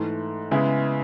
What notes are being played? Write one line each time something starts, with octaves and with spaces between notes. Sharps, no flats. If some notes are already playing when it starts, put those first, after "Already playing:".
Already playing: G#2 E3 A3
C#3 G#3 B3 E4 G#4